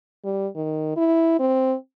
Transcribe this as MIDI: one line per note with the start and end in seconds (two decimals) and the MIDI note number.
0.24 0.47 55
0.56 0.95 51
0.97 1.37 64
1.39 1.75 60